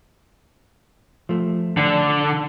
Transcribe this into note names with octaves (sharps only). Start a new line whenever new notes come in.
F3 A3
D3